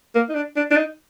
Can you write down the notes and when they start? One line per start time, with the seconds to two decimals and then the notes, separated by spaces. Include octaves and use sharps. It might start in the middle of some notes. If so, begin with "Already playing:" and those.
0.15 A#3
0.29 D#4
0.35 D4
0.56 D4
0.71 D4
0.77 D#4